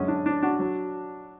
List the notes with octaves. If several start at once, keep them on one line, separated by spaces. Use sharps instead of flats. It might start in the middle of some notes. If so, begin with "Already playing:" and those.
Already playing: F#2 D3 G#3 C#4
D4
D4
D4 F#4
F#3